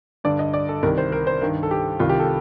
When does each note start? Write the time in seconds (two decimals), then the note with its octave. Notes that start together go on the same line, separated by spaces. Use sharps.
0.24 G2 D3 D5
0.39 D#5
0.54 D5
0.69 A4
0.83 C2 C3 D#3 A#4
0.98 C5
1.12 A#4
1.27 C5
1.42 G2 D#3 A#4
1.63 A4
1.71 G4
2.00 C2 C3 D#3 F4
2.09 G4
2.20 A4